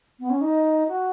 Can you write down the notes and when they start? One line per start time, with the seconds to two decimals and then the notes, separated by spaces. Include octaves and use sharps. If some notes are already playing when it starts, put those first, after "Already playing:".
0.19 B3
0.29 C#4
0.41 D#4
0.88 F#4